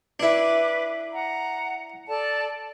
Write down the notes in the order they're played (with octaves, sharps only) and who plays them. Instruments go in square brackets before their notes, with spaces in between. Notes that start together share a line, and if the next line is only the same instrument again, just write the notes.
[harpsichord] D4 E4 [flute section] B4 D6
[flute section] F#5 A#5
A4 D5 A5